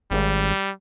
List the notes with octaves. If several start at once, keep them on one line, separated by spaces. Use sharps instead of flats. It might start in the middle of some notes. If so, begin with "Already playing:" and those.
G#1 G3